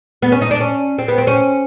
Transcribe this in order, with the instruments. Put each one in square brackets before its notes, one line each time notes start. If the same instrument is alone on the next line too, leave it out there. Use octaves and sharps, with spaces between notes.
[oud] B3
C#4
D#4
D4
C#4
C4
B3
C4
C#4